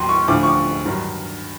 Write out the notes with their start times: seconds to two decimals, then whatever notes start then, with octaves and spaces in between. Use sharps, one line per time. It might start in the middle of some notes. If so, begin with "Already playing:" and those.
Already playing: D#2 D#3 F#3 C6
0.09 C#6
0.28 D2 D3 F3 D6
0.43 C#6
0.47 D6
0.85 G2 D#3 F#3